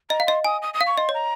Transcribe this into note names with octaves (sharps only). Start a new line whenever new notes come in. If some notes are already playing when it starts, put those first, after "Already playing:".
D#5 A#5
F5
D#5 C6
G#5 D#6
D#6
D#6
F5
C#6
D#5 C6
C#5
A#5